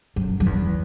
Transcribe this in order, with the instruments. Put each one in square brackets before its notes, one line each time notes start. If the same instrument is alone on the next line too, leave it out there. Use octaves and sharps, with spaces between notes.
[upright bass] F#2
F#2
E2